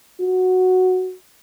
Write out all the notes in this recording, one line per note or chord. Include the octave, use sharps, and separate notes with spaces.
F#4